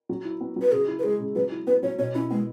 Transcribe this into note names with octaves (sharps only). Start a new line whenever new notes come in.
F#3
E4
B3
F#3
B4
C#3 G#4
E4
B4
G#3 G#4
C#3
F#3 B4
E4
B3 B4
F#3 C#5
B2 C#5
C#4 E4
G#3 B3